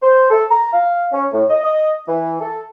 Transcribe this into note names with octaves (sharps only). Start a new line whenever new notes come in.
C5
A4
A#5
F5
C#4
A2
D#5
D#5
E3
A4